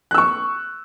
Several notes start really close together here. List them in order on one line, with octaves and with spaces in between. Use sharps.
F#6 E6 C#6